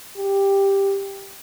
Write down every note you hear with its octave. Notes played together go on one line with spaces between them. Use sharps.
G4